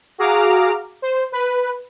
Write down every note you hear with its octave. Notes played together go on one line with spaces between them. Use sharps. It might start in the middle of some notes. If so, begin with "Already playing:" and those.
F#4 G#4 F5 A#5 D6 F6
C5
B4